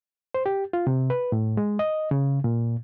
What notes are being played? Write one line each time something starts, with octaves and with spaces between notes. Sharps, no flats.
C5
G4
F4
C3
B4
A2
G#3
D#5
C#3
A#2